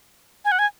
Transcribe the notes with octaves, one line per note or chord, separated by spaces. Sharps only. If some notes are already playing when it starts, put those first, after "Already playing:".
G#5
F#5
G#5